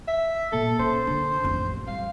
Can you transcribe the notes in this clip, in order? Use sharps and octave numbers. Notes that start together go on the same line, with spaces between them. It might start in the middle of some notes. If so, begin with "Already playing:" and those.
E5
A#2 A4
C#4 C5
D3 D#3
A1 F2
G3 F5